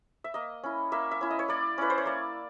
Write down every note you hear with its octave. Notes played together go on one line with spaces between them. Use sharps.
E5
A#3 D#5
C#4 E4
A#3 E5
E5
C#4 E4
D#5
C#5
A#3 D5
C#4 E4 B4
C5
C#5
A#3 D5